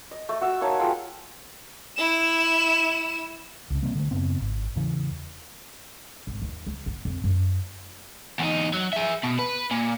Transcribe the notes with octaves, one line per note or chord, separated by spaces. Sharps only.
D#5
A3
F#4 E5
A#3 D#4 C#5 A5
F4 G#4 A4 G5
E4 E7
C#2 C#3
C3 G3 A#3 C4
D3 A3
F#2 C#3 B3 C4
G#1
E2 C#3 E3
G#1
D#2
C#2
B3
F2
F#2
E2 D#4
F#3
G#4 E5
B2
B4
A#2